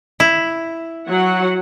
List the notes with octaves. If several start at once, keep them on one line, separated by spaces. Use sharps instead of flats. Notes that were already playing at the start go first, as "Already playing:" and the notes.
E4
F#3 F#5